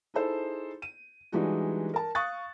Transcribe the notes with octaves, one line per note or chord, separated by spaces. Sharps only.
D#4 E4 G#4 A4 C5
D#7
E3 G3 G#3 D4 D#4 F#4
A#4 A5
F5 C#6 D#6 F#6 A6